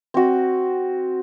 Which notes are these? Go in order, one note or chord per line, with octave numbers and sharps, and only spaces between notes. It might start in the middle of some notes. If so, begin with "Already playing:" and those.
C4 F#4